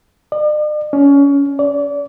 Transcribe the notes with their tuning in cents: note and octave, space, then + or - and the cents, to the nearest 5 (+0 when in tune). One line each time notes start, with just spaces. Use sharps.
D5 +45
C#4 +25
D5 -35